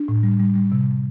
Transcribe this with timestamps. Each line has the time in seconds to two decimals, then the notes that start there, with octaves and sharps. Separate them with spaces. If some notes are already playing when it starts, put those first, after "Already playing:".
Already playing: D4
0.08 A2
0.23 G3
0.40 G3
0.56 G3
0.72 C3